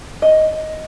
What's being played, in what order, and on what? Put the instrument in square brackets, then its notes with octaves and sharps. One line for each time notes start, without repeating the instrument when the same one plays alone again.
[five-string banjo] D#5